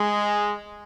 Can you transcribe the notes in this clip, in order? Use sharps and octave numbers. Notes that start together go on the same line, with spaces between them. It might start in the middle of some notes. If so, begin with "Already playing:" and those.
Already playing: G#3